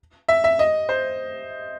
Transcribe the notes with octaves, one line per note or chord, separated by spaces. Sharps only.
E5
E5
D#5
C5